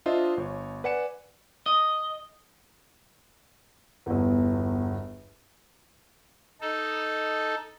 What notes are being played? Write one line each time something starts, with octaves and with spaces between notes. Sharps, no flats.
D4 F4 C5 D#5 E5
G1 C#5
B4 D5 F#5 G#5 C#7 E7
D#5
G1 E2
D#4 A4